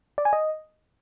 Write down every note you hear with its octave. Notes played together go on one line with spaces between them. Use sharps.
D5
G#5
D#5